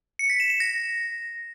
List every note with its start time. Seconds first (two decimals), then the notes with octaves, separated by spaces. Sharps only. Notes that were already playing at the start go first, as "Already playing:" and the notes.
0.19 C#7
0.30 B6
0.40 E7
0.50 E7
0.60 A#6